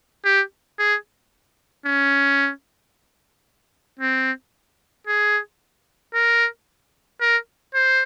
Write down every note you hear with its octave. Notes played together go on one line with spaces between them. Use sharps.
G4
G#4
C#4
C4
G#4
A#4
A#4
C5